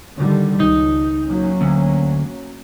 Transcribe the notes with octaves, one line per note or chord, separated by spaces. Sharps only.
D3 D#3 G3
C#2 D#4
F#3 A#3 C#4
D2